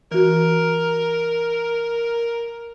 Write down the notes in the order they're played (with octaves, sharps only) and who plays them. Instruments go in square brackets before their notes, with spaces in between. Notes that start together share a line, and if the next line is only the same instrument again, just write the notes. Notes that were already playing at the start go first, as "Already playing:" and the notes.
[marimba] E3 F#4 [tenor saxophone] A#4